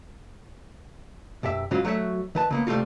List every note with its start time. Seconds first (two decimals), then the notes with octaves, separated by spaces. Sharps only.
1.43 B1 F#2 G4 E5
1.71 G#2 C#3 F#3 C#4 F4 F#4
1.85 F#3 A3 F#4 C#5 E5
2.35 D#3 B4 A5
2.50 C#3 A#3 B3
2.67 C3 G3 A3 F4 F#4